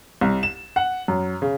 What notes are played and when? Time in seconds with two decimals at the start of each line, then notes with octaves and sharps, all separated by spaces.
0.21 C2
0.43 E7
0.76 F#5
1.08 F#2
1.42 C#3